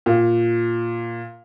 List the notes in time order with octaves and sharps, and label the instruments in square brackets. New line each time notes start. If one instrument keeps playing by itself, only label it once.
[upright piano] A#2